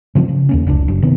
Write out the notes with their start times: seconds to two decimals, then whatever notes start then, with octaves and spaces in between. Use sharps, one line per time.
0.15 C#3 F3 G3 C4
0.29 C#3
0.49 D#2 A#3 C#4
0.67 F1 C#2 D4
0.88 F#1
1.02 C3 D#3 B3